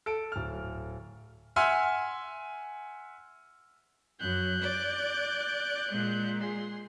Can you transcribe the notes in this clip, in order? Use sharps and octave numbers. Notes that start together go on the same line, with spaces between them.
A4 D7
D1 F6
E5 F#5 G#5 C6 E6 F6
F#2 F#6 G6
D5
A#2 G#3
G#4 C6